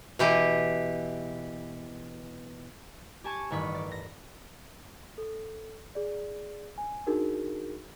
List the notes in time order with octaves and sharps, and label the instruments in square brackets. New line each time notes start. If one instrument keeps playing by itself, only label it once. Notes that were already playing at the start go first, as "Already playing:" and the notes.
[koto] B2 E3 G4
[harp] G4 G#5 A5 C#6 G#6
A1 G2 D#3 B4 C#6 B6
D5
A#6
[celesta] A4
G#4 D5
G#5
D4 D#4 F#4 G#4 A#4